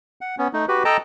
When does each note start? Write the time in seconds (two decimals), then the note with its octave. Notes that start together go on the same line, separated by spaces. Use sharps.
0.21 F#5
0.38 B3 C#4
0.53 A3 D#4
0.68 F#4 G4 B4
0.85 A4 D#5 G5 A5 A#5